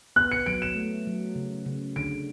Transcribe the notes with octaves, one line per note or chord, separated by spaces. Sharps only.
B3 F#6
C#7
F#3 D7
E7
A3
F#3
C#3
C#3
D3 D7